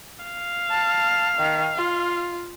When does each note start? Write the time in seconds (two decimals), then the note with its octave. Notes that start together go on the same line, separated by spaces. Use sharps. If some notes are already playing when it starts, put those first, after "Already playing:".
0.24 F5
0.70 A5
1.38 D#3
1.75 F4